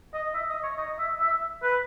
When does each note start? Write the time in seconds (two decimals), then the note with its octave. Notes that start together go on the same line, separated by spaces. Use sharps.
0.14 D#5
0.34 E5
0.49 D#5
0.63 C#5
0.77 D#5
0.99 E5
1.20 E5
1.63 B4